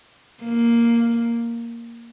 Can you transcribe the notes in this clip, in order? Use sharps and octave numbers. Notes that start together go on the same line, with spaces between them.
A#3